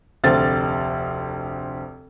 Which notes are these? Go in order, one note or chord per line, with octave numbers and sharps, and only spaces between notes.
F1 D2 C4 A6